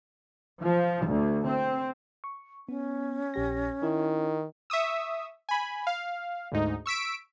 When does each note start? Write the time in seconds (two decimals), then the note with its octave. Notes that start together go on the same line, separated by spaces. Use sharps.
0.61 F3
1.06 D2
1.47 C4
2.24 C#6
2.69 B3 C#4
3.34 A#1 G4 A#6
3.83 D#3 E4
4.70 E5 C#6 D#6 E6
5.49 G#5 B5
5.87 F5
6.52 D2 G#2 D#4
6.86 C#6 E6 B6 D7